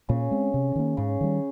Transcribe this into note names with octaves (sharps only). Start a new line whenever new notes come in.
A#2 C#3
G#3 C4
C3
D#3 A#3
G#2 C#3
D#3 G3